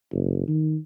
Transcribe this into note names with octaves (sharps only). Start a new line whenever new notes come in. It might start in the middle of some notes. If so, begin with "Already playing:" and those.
F#1
D#3